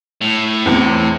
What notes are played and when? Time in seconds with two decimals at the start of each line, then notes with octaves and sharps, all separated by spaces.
0.21 A2
0.66 E2 C4 C#7